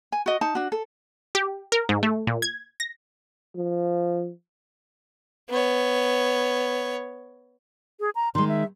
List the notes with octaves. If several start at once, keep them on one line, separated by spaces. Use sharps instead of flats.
G#5
F#4 D#5
D#4 A5
D4 F#4
A4
G4
A#4
G#2
A3
A#2
G#6
A#6
F3
B3 C#5
G#4
A#5
D#3 G#3 C6
E5